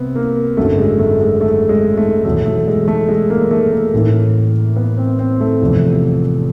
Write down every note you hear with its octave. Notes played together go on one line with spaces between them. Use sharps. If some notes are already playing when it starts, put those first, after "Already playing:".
Already playing: C2 B3 C4
A#3
G#1 F#2 D3 F#3 A3
G#3
A3
G#3
A3
G#3
A3
E2 B2 F#3 A3
A3
G#3
A3
G#3
A#3
A3
A#3
A1 A2 E3
B3
C4
C4
A3
F1 E2 C3 F3